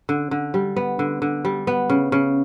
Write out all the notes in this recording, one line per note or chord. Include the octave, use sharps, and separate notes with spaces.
D3
D3
G3
B3
D3
D3
G3
B3
C#3
C#3